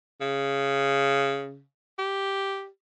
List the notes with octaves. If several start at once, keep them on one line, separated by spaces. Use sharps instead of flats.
C#3
G4